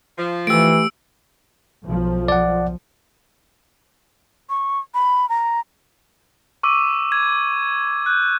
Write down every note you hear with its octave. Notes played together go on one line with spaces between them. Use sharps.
F3
E3 A3 G4 E6 D7
B1 F3
D5 F#5
C#6
B5
A#5
C#6 D6 E6 D#7
G#6
F#6 G6